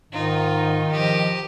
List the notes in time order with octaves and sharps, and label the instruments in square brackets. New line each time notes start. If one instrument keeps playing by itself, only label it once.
[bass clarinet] G#2 [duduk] D#3 [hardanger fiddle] D#4 F4
[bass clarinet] F3 [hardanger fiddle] G4 [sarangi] D#5